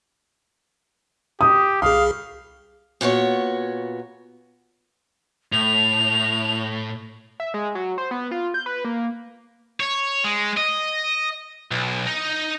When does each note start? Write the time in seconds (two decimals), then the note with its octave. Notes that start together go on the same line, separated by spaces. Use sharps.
1.41 G4 D#6
1.82 C2 G#4 F5 D#6
3.01 A#2 B3 F#4 C#5
5.52 A2 F7
7.40 E5
7.54 G#3
7.75 F#3
7.98 C5
8.11 B3
8.31 F4
8.54 G6
8.66 B4
8.85 A#3
9.80 C#5
10.25 G#3
10.57 D#5
11.71 B1
12.07 D#4